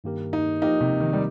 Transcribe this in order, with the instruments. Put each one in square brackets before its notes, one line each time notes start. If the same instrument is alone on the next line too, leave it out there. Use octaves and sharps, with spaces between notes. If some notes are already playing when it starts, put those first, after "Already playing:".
[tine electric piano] G2 D#3 A#3 G4 A#4
[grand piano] D#4
[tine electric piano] F3 A#3 G4 A#4 D#5 [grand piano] D#4
[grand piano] C3
D#3
G3